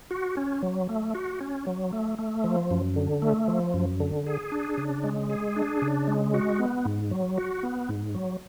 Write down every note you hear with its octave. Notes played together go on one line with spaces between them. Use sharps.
F#4
C#4
F#3
A3
F#4
C#4
F#3
A3
A3
F3
F#2
D3
A3
F3
F#2
D3
G#4
D4
C#3
G#3
G#4
D4
C#3
G#3
F#4
B3
G#2
F#3
F#4
B3
G#2
F#3